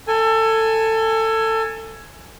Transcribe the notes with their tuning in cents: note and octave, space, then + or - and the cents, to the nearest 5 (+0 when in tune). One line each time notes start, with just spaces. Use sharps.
A4 +20 G#5 +0